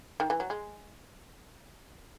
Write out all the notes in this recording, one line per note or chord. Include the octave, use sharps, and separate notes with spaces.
D#3
E3
F#3
G#3